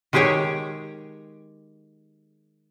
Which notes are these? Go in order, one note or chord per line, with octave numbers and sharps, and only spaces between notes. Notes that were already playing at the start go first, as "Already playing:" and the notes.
D#3 G#3 G4 G#4 C#5 G5